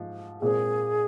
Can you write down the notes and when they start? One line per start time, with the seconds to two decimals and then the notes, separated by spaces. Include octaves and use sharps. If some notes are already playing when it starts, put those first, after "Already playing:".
Already playing: G#2 F3
0.41 A#2 G#3 C4 G#4